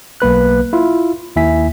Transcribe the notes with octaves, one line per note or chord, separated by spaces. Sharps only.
B1 A#3 B4 F#6
E4 F4
D#2 E4 E5 G#5 B6